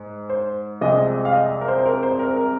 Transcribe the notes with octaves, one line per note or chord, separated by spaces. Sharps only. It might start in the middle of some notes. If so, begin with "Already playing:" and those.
Already playing: G#2
C5
C2 C3 F3 G#3 D#5
F5
D#5
A#4
C5
C5
A#4
C5
A#4
A#4